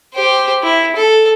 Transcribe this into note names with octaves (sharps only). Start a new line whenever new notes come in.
G4 C5
E4
A4